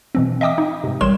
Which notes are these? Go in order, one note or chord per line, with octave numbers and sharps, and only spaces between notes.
B2 E3 C4
D#5 E5 G5 D6 D#6
D#4
G#2 C3
A1 G3 A#4 C#5 C6 E7